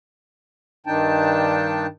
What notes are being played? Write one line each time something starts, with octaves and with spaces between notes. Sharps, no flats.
G2 D#3 D4 D#4 G5 A5